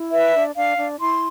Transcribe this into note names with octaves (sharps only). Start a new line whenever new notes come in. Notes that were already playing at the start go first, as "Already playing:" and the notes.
Already playing: E4
B4 E5
D4
D4 F5
D4
E4 C6